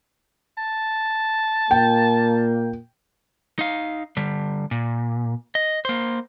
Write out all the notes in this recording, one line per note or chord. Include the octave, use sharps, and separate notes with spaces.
A5
A#2 A#3 G5
D#4 F5
D3 G3
A#2
D#5
A#3 C5